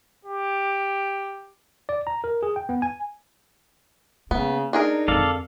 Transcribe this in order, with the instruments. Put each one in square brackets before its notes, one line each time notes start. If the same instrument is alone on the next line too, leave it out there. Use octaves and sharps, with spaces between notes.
[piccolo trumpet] G4
[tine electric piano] D5
A#5
A#4
G#4
G5
B3
G#5
[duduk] C#3 [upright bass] A#3 [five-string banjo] B3
[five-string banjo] D4 G#4 A#4 [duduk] D#4
[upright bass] F2 D3 [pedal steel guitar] A4 D5 F5